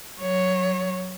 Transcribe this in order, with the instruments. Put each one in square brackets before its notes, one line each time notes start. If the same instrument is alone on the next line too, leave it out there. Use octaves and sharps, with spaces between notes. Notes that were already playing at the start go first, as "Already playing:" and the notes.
[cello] F#3 C#5